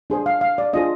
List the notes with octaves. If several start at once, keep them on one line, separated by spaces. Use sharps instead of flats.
D4 G#4 C5
F5
F5
D5
D4 F4 G#4 C5 D#5